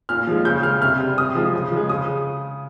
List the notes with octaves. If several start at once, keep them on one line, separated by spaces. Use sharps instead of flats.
A#2 F6
F3 G#3
C#3 G6
G#3 F6
C3 F6
G3
C3 D#6
F3 G#3
C#3
F3 G#3
C#3 D#6